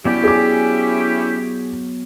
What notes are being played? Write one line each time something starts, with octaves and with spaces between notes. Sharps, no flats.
F#3 B3 C#4 E4 G4 D5
G#4 D6